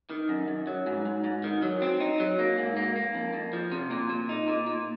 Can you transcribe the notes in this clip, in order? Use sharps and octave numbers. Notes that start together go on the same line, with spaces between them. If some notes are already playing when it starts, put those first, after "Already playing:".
D#3
F#2
F#2
F#3
G#2
G#2
G#2
D#3
F#3
C4
D#4
F#3
A#3
G#2
A#3
A#3
F2
F2
F3
C3
A#2
A#2
D#4
A#2
A#2